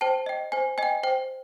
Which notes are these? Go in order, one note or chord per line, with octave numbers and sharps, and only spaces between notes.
C5 G5 A5
D#5 G5
C5 G#5
D#5 G5 G#5
C5 G5